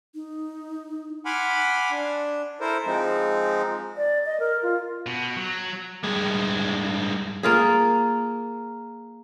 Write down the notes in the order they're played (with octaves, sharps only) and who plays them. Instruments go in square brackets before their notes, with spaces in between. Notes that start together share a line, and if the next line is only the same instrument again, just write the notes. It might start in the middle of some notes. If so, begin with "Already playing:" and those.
[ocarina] D#4
[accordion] F#5 G#5 B5 C6 D6 F6
D4
E4 A4 A#4 C5
F3 G#3 C4 D#4
[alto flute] D5
D#5
A#4
F4
[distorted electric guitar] B2
F#3
[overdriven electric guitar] G2 G#3
[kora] A#3 F4 G#4